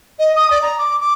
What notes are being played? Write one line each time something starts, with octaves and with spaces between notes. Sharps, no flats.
D#5
D#6
D5
A#5
D6
D6